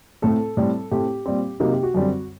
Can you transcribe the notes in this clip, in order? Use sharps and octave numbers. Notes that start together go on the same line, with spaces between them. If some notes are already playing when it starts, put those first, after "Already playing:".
A2 A3 C4 A4
A2 G3 C4
A2 A3 C4 G4
A#2 G3 C4
C3 F#3 A#3 D#4
G4
F#4
F#2 D3 G3 C4